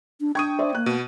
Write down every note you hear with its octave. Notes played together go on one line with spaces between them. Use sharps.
D4
D4 G5 C#6 D#6 G#6 D#7
C5 D5 E5
A#3 F#6
B2 D#7